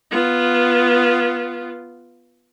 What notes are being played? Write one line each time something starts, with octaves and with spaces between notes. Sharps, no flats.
B3 F4